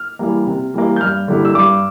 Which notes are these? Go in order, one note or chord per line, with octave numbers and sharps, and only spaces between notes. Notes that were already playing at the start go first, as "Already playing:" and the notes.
Already playing: F6
E3 G3 A#3
C3
E3 G3 A#3
G6
G2 F6
D3 G3 A#3 E4
E6
G2 D6